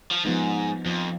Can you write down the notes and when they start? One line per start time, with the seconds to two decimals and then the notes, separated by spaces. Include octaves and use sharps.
0.11 F3
0.25 G#2 F3 B3 D#4
0.86 F2 F3